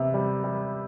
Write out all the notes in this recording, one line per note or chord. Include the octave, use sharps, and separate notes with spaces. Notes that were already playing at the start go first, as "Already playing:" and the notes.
Already playing: C3 B3
G3
G3